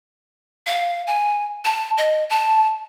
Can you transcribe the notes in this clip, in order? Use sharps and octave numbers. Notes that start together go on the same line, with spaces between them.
F5
G#5
A5
D#5
A5